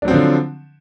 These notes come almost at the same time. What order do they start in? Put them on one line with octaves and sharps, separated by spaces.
D4 F#3 C4 F3 D3